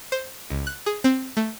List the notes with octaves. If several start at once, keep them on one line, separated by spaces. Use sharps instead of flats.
C5
C#2
F#6
G#4
C4
A3